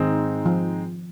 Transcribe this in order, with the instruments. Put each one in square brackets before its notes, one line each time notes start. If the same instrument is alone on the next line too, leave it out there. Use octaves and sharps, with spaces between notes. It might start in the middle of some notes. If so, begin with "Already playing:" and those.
Already playing: [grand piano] G#2 G#3 C4 D#4 [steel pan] D#3
[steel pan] F3